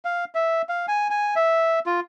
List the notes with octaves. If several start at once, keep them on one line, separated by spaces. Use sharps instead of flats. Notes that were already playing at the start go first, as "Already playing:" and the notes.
F5
E5
F5
G#5
G#5
E5
F4